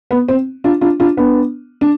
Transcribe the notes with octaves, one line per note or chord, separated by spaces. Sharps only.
B3
C4
D4 F4
D4 F4
D4 F4
B3 D4
D4